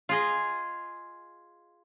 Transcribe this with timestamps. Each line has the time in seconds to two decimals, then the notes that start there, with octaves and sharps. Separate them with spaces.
0.09 F4 G#4 D#5